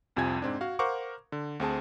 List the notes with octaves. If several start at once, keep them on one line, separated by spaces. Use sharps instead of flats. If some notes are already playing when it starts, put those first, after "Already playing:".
C2 F2 C3 F3 G#5 G#6
G#2 C4 D4
F#4 F5
A#4 C5 F5 F#5 C#6 D6
D3
D2 C4 G#4 A5